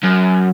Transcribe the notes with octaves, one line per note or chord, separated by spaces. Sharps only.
F#2